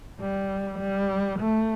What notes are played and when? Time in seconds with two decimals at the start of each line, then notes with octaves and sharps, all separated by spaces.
0.20 G3
0.80 G3
1.39 A3